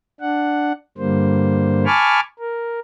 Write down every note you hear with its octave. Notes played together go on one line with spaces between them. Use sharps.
D4 F#5
G2 D3 G3 A#3 C5
G#5 A5 B5 C#6 D6 F6
A#4